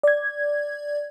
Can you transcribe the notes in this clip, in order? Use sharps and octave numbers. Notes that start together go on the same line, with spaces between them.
D5 G#6